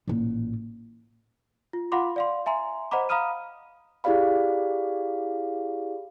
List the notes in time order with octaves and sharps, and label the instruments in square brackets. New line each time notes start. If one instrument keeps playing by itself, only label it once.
[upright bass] A1 A#2
[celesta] F4
F4 F5 F#5 B5 C6 D6
D5 F5 C6
E5 G#5 A#5 C6
C5 D#5 F#5 A#5 B5 D6
F5 A#5 B5 D#6 F6 D#7
[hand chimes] E4 G4 G#4 D5 F5 B5